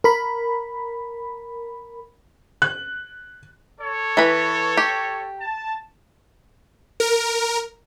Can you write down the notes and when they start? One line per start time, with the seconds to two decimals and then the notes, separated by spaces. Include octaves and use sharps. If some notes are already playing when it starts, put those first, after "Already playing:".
0.04 A#4 B5
2.62 F#6
3.81 A4 C#5
4.17 E3 B4
4.77 G4
5.41 A5
7.00 A#4